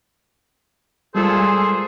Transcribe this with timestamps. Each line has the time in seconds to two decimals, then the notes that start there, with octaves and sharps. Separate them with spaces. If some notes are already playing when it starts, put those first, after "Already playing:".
1.15 A#2 G3 G#3 F4 G#4 A4 C5